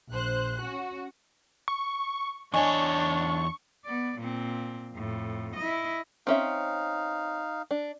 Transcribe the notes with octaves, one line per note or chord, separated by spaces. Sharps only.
A#1 C5 F#6
C#4 F#4
C#6
E2 D4 C#5 D#5 G#5 C#6
B3 D5
A#2 C4
F2 A2
E4 D#5
C4 C#4 D#4 E5 F5
D4